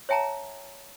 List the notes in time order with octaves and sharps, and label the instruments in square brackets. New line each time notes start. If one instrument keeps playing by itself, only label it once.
[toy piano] C#5 E5 G5 A5 A#5